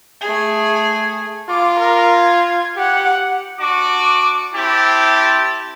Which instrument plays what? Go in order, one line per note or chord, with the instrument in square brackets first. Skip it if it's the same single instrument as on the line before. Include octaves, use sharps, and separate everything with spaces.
[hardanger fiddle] A3 G#4
[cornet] F4 [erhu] D6
[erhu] A#4
G#6
[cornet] G4 [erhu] F#5
[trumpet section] D4 F#4 D6
C4 E4 G4 A5